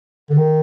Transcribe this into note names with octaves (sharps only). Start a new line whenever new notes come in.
D3
D#3